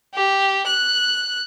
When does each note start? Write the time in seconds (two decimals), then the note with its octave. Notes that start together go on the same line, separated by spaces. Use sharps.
0.14 G4
0.67 F#6